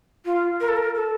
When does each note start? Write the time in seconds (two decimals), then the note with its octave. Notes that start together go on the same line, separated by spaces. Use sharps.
0.25 F4
0.60 A#4
0.68 A4
0.76 A#4
0.95 A4